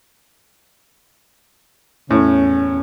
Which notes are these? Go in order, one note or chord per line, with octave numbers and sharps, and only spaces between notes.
E2 A2 C#4